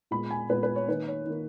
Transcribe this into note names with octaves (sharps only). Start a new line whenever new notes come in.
A#2 G#3 B3 B5
G#5
A#2 G#3 B3 B4
B4
C#5
D#3 A#3 B4
C#5
D#3 A#3